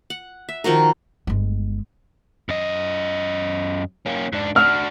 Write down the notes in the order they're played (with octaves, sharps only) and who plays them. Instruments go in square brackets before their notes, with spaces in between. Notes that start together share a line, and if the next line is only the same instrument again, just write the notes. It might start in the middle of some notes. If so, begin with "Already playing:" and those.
[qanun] F#5
E5
D#3 F3 F#4 A#4
[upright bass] G1 G#3
[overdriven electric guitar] F#2 D#5
A#3 C#4
G#2 D4
[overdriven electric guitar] D4 F#4 [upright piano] F6